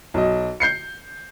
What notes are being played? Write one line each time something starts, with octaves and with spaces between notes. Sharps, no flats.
B1 D#5
G6 C7 C#7